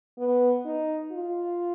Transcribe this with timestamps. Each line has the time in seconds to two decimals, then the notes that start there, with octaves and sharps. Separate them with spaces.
0.18 B3
0.65 D#4
1.12 F4